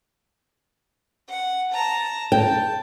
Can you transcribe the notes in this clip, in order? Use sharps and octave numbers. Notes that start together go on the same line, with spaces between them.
F#5
A5 A#5
G5 A5